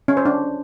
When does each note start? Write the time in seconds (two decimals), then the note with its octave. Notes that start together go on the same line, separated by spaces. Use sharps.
0.08 C#4
0.17 C5
0.25 D4